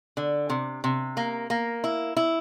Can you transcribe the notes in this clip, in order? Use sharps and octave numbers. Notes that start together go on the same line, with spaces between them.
D3
C3
C3
A#3
A#3
E4
E4